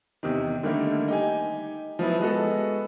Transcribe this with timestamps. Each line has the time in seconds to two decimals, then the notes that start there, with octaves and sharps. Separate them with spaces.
0.23 E2 C3 D#3
0.63 D3 D#3 G3 A3 A#3
1.08 D#4 G4 G#5
1.99 F3 F#3 B3 E4
2.20 G#3 B3 F#4 A4